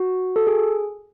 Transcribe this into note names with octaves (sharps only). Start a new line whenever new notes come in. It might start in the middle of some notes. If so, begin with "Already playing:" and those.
Already playing: F#4
A4
G#4